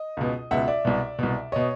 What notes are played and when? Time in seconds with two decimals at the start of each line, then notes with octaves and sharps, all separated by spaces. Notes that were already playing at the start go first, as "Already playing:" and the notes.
Already playing: D#5
0.17 C#2 B2
0.51 C#2 B2 E5 F#5
0.68 D5 E5
0.85 C2 B2
1.19 C2 B2
1.52 B2 C#5 D#5